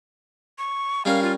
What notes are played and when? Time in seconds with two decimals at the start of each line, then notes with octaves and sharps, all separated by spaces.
0.58 C#6
1.05 G3 C#4 A#4 F5
1.23 F4